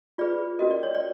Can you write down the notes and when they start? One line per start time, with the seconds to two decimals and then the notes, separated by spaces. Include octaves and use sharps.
0.18 F4 G#4 B4 D5
0.59 C#4 F#4 A#4 D#5
0.71 D5
0.83 C#5
0.95 D5